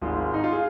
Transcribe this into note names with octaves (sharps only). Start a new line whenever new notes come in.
G#1 G#2 G#3 F4
D#4
F4
G#4